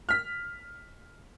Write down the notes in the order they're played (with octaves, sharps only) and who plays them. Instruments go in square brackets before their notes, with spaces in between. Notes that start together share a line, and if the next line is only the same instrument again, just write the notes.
[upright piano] F6 B6